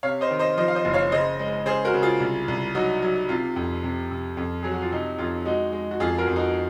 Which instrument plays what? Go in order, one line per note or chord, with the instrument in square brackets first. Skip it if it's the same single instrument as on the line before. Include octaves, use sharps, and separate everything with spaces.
[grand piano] C3 C#5 F5
C5 D#5
D#3
C5 D#5
F3 C5 D#5
F5
C5 D#5
F#1
C#5 F5
C#3 C5 D#5
G#3
C#3 G#4 C5
F#4 A#4
C#3
F4 G#4
C2
C2
F#3 D#4 F#4
F#3
C3 F4
F2
C3
C3
F2
F#3 G#4
F#4
F4
C3 D#4
F2 F4
G#3 D#4 F#4
G#3
F#4
F2 F4 G#4
F#4 A#4
F2
D#4 F#4